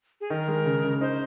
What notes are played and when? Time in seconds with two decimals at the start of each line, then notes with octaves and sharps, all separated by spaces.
0.21 G#4
0.30 D#3 A#4
0.48 G#3
0.65 C#3
0.84 C#3
1.01 D#4 C5